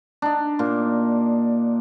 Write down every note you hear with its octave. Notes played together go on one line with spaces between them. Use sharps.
D4 D#4
A#2